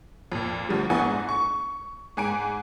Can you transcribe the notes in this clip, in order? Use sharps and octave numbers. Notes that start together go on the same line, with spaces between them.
F2 A#2
D2 F3 G3
A#1 B3 E4 F#5 G#5
G#2
C#6
G#2 G#5 D7